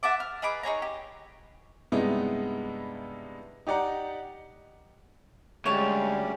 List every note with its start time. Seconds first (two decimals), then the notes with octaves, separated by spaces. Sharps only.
0.03 E5 F#5 A5 D6
0.20 F6
0.42 D#4 G#4 B4 D6
0.63 D#4 G#4 C#5 A#5
0.82 G4
1.92 G2 C3 G#3 B3 D#4 E4
3.67 D#4 G4 D5 F#5 A#5
5.66 D2 G3 G#3 C#4 G4 C#5 A5